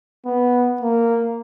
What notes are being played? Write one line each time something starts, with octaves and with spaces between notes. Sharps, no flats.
B3
A#3